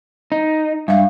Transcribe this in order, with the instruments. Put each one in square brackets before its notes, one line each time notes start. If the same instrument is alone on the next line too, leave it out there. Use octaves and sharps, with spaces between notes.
[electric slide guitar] D#4
[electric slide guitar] G2 [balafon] E5 F5